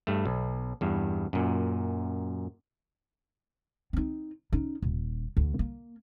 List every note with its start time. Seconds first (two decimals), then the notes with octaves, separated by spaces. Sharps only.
0.07 G2 A3
0.25 B1
0.81 E2 G2
1.33 F#2 A#2
3.93 C4 D#4
4.53 C#4 D#4
4.82 D#1
5.37 D2
5.59 A#3